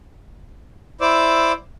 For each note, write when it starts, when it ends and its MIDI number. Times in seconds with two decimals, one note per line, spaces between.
1.01 1.52 64
1.01 1.52 72
1.01 1.52 74
1.01 1.52 86
1.01 1.52 88